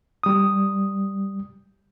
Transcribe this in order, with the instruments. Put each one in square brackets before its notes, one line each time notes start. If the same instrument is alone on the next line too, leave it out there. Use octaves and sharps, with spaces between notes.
[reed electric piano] G3 D#6